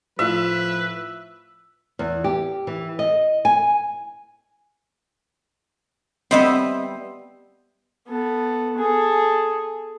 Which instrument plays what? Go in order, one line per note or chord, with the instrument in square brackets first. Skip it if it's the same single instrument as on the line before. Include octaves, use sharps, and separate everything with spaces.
[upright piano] A2 F4 [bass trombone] F3 [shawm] B4 [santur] E5
[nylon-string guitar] E2
G4
E3
D#5
G#5
[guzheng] G3 B3 E5 [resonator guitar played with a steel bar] C4 D#5
[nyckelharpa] B3 A4
G#4 A4